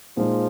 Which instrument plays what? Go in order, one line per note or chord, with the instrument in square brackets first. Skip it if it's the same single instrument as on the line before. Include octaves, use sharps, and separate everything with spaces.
[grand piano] A#2 G#3 D#4 G#4 [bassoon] F3